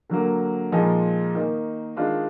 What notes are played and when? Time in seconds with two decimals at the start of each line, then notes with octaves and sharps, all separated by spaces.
0.10 D3 F#3 A#3
0.72 A#2 F3 G#3 D#4
1.35 D#3 A#3 D#4
1.97 D#3 G#3 D4 F4